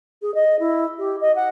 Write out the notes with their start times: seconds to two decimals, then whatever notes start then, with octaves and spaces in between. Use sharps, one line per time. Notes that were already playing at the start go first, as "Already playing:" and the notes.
0.22 G#4
0.35 D#5
0.60 E4
0.98 G4
1.21 D#5
1.36 F#5